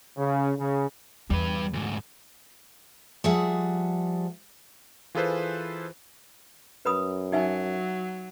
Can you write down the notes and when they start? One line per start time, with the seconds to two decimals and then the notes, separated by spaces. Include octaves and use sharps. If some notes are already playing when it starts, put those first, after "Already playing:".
0.17 C#3
0.59 C#3
1.30 E2 G3 B4
1.73 D2 G#2
3.24 F3 G3 G#4 E5 F#5
5.15 E3 F4 G#4 A4 B4 C5
6.85 F#2 B4 B5 D#6
7.33 F#3 D#4 E5 G#5